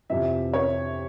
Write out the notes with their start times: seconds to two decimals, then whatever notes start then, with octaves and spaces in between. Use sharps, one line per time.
0.10 F2 C3 E3 E5
0.53 C#5